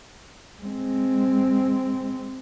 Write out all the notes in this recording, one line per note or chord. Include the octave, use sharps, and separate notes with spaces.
G#3 C4